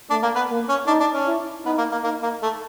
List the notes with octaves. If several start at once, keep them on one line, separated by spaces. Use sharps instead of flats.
A3 D4
A#3
B3
A#3
C#4
D4 D#4
D4
C#4
E4
B3 D#4
A#3
A#3
A#3 D#4
A#3
A3